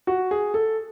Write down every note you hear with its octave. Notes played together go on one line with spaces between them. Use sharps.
F#4
G#4
A4